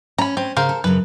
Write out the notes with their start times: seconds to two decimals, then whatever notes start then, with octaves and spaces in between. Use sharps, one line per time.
0.18 C#4 A#5 B5
0.37 C4 C#4
0.57 C#3 A#4 C5 F5
0.69 A4
0.84 F#2 C#3 B4